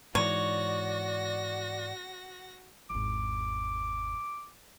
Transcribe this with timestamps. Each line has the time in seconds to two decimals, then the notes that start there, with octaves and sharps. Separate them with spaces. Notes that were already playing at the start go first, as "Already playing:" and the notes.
0.15 G#2 E3 F#4 C#5 D5 A#6
2.90 G#1 E2 D6